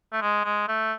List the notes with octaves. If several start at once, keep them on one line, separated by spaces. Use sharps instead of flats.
A3
G#3
G#3
A3